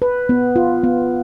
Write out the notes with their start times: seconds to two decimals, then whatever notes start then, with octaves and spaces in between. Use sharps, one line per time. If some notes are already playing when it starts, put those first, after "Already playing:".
0.02 B4
0.29 B3
0.56 F4
0.84 B3